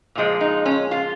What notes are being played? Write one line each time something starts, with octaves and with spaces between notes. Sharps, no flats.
A#2 F3 G#3
D#4
C#4
F4